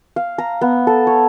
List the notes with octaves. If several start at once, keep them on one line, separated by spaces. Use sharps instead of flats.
F5
A#5
B3
A4
C#5